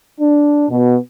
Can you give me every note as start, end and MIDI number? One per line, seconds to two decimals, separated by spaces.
0.19 0.64 62
0.69 0.96 47